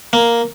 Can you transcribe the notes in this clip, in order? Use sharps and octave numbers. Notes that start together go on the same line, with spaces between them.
A#3